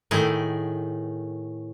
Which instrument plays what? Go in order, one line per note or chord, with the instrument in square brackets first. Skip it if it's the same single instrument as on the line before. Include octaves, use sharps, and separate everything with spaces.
[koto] A2 D#3 G#4